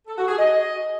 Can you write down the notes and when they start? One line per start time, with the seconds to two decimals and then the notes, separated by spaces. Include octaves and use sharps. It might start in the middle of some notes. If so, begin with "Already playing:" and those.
0.08 A4
0.18 F#4
0.28 G#4
0.39 D#5